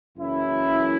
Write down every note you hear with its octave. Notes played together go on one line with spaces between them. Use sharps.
F#1 F#2 E3 C#4 E4